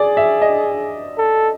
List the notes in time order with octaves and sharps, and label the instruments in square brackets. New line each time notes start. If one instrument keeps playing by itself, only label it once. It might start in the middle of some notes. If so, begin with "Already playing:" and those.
Already playing: [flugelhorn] G#4 [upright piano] D5
[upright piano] E5
D#5
[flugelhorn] A4